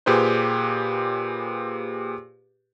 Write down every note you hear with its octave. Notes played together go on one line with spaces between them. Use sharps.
A#2 G4 G#4 B4 C5